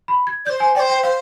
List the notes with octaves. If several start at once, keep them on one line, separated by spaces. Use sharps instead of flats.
B5
G#6
C5 D5 G6
G#5
C5 D5 G5
G5
C5 F5